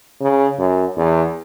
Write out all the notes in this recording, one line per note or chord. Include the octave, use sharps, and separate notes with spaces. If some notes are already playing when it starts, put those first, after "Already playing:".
C#3
F#2
E2